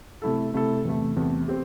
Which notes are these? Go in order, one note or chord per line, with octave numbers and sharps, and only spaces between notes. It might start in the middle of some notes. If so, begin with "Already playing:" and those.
C3 A3 E4 A4
C3 A3 E4 A4
E2 C3 A3
E2 C3 A3
C4 G4